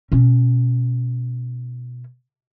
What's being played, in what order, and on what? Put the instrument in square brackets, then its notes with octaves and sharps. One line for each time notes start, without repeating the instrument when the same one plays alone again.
[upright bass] B2 C#4